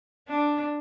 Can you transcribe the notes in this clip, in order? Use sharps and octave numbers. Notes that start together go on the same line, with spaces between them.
D4